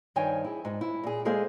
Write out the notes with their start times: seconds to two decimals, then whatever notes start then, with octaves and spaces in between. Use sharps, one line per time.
0.16 G2 D#3 C5 C#5 G5 G#5
0.44 E4 G#4
0.65 G#2
0.81 E4
1.04 A#2 G#4
1.25 G#3 A#3 G#4 A4 C5 G#5